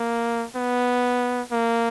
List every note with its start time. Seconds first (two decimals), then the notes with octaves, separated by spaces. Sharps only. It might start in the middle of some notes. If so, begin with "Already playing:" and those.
Already playing: A#3
0.56 B3
1.52 A#3